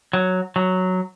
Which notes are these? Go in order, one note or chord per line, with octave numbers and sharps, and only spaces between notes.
F#3
F#3